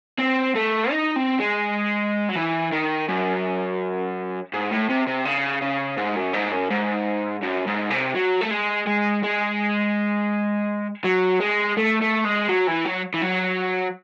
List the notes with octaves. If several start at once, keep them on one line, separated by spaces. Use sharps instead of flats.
C4
A3
D#4
C4
G#3
F#3
E3
D#3
F#2
G#2
A2
C3
C3
C#3
C#3
G#2
F#2
G#2
F#2
G#2
F#2
G#2
C3
F#3
A3
G#3
G#3
G#3
F#3
G#3
A3
A3
G#3
F#3
E3
F#3
E3
F#3